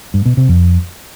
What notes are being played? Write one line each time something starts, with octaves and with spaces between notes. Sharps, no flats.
G2
B2
C3
F2